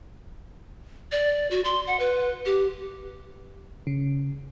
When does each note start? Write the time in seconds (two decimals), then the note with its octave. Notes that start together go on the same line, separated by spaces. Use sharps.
1.12 D5
1.51 F#4
1.65 C6
1.87 F#5
2.00 B4
2.46 G4
3.87 C#3